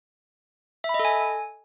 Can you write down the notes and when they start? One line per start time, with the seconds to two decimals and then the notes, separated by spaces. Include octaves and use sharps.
0.84 E5
0.89 B5
0.94 D#5
0.99 A4
1.05 G#5